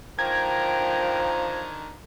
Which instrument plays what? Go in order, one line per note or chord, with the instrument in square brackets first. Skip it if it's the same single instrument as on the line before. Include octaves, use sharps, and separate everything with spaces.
[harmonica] D3 D#3 A#5 [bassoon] F3 [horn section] A#4 G5 [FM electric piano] G#6